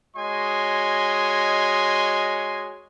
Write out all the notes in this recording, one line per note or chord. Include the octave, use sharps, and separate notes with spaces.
G#3 F#4 C#5 D#5 G#5 C6